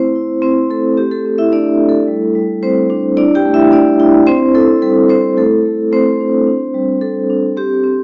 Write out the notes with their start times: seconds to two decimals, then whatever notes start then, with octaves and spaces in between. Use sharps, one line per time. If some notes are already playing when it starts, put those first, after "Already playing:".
Already playing: A3 C4 E4 C5
0.15 E4
0.42 C4 E4 C5
0.70 A3 A4
0.97 C4 G4
1.11 A4
1.25 C4
1.38 E4 E5
1.52 A3 D4 D5
1.80 E4
1.89 A4
2.07 G3
2.35 G3
2.63 G3 C4 C5
2.90 D4
3.17 D4 E4 D5
3.35 G4 G5
3.45 A3
3.54 E4 E5
3.72 A3 D4 D5
4.00 E4
4.27 C4 E4 C5
4.55 E4 A4
4.82 G3 A4
5.09 C4 E4 C5
5.37 A3 A4
5.65 A3
5.92 A3 C4 C5
6.20 D4
6.47 D4
6.74 G3
7.01 D4 A4
7.30 D4
7.57 C4 G4
7.84 C4